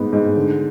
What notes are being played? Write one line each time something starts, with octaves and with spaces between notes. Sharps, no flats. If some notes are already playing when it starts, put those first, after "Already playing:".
Already playing: G#2 B3
G#2
D3